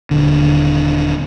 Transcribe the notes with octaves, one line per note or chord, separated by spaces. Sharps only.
D#1 D3